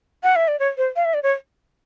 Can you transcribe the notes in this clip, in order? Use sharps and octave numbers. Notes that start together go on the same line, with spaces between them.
F#5
E5
D5
C#5
C5
F5
E5
D5
C#5